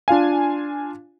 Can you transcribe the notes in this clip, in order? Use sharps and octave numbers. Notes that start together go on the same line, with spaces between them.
D4 F4 F5 G#5